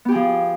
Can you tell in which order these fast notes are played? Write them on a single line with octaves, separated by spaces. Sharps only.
B3 G4 G#4 F3